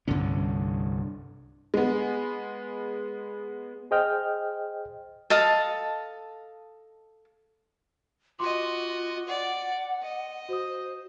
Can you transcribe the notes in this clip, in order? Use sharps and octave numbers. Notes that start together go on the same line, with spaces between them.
C2 G2 D3 C#4
G#3 B3
G#4 C5 D#5 G5 F6
A4 D#5 F5 A5
F4 F#4 D#5 C6 D6
D5 F#5
D#5
F#4 C5 D#6